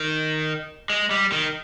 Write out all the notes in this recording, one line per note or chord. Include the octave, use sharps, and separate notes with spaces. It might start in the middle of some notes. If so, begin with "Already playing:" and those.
Already playing: D#3
G#3
G3
D#3